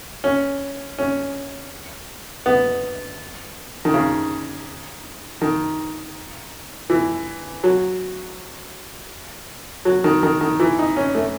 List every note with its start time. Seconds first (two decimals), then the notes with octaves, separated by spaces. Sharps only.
0.24 C#4
0.98 C#4
2.46 B3
3.85 D#3
3.94 C#3
5.41 D#3
6.90 E3
7.64 F#3
9.85 F#3
10.04 D#3
10.23 D#3
10.41 D#3
10.60 E3
10.79 D#4
10.97 C#4
11.15 A3